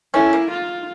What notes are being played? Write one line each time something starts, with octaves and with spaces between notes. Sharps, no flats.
A3 C#4 E4
A#3
F4